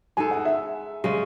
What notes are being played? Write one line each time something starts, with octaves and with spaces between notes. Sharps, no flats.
G#3 D#4 A4 G#5
F#5
E5
C#3 G#3 C#4